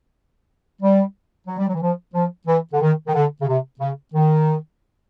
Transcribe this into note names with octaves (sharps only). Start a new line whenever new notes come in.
G3
F#3
G3
F#3
E3
F3
F3
E3
D3
D#3
D#3
D3
C#3
C3
C#3
D#3